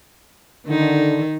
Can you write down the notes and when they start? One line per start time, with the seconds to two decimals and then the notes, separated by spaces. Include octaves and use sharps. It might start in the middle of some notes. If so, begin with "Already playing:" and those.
0.67 D3 D#3 D#4